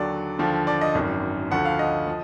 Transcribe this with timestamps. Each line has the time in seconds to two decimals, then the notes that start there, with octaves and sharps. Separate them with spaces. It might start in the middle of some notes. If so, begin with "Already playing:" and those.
Already playing: D#2 D3 F#3 D5
0.39 D#2 D3 F3
0.67 D5
0.81 D#5
0.95 G#1 F#2 D#3
1.51 D2 D3 F3 F#5
1.65 F5
1.79 D#5
2.08 F3